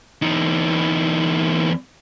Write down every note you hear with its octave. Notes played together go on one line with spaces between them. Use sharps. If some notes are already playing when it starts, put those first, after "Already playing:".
E2 D#4